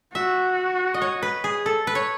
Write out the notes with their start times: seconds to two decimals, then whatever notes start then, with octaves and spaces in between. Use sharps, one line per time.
0.15 F#4 E5
0.94 D#5
1.02 C#5
1.23 B4
1.44 G#4
1.66 A4
1.87 B4
1.95 C#5